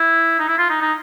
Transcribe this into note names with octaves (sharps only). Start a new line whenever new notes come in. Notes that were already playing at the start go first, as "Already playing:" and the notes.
Already playing: E4
D#4
E4
F4
D#4
D#4